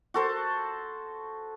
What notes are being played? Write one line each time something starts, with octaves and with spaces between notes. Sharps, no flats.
F#4 A4 C5